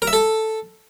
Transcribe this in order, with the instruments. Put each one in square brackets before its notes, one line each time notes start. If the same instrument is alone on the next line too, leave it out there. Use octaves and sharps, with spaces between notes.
[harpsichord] A#4
E5
A4